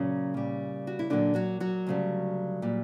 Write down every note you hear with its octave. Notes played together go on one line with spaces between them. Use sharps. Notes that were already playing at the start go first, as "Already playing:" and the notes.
Already playing: A#2 C#3 F#3 C#4
A#2 G3
F#4
E4
A#2 D3 F#3 D4
F#3 F#4
F#3 F#4
D2 C#3 G3
A#2 G3